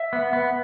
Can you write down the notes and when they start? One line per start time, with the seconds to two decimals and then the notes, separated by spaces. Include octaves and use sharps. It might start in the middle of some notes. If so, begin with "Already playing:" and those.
Already playing: E5
0.13 B3
0.33 B3